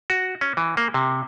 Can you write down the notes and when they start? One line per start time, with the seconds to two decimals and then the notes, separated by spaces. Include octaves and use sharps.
0.10 F#4
0.41 C#4
0.57 E3
0.77 A#3
0.94 C3